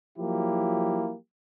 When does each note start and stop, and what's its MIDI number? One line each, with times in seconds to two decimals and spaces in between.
0.17 1.15 53
0.17 1.15 54
0.17 1.15 58
0.17 1.15 64
0.17 1.15 67